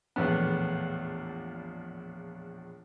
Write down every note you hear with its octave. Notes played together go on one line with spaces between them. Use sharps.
A#1 E2 A2 B3